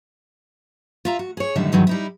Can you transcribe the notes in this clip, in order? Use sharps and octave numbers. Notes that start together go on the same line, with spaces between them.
F4 E5 A#5
F#4
G#4 C#5
F#2 A2 D3 D#3 G3 E5
G2 D#3 E3 F#3 G#3
G3 D#4 E4